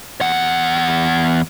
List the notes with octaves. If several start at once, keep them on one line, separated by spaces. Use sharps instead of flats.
E2 F#5